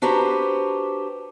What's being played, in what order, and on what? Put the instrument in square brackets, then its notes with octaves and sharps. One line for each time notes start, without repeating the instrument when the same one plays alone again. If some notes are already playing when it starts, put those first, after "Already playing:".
[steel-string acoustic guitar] D4 F#4 G4 B4 C5 A#5